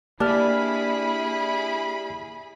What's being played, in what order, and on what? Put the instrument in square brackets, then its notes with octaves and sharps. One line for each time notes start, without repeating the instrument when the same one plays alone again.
[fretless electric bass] A#3 [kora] D4 [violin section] E4 G#4 B5 [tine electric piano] G4 D5 F6